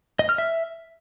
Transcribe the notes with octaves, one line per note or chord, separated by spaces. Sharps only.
D#5
F6
E5